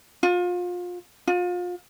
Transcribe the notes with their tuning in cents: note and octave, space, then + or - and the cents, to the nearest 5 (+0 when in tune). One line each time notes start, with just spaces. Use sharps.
F4 +30
F4 +30